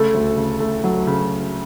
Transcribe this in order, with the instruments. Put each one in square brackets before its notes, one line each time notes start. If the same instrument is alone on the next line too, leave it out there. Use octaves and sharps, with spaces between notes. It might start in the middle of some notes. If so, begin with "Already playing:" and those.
Already playing: [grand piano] C#3 A3 A4
D2
C#3
A3
F#3
C#3